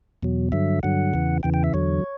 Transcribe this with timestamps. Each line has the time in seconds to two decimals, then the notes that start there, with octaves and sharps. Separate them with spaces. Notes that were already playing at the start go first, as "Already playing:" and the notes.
0.23 E2 B2 F#3
0.52 G2 D3 F#3 E5
0.83 G2 D3 F#3 F#5
1.13 E2 C#3 E3
1.43 E2 C#3 E3 G5
1.54 G5
1.64 E5
1.74 E2 D3 F#3 C#5